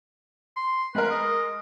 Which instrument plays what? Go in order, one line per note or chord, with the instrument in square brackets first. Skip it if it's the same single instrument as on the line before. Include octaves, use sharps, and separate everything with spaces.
[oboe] C6
[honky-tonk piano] G#3 A#4 [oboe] B4
[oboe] D#5